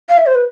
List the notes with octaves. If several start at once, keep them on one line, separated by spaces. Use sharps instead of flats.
F5
E5
C5
B4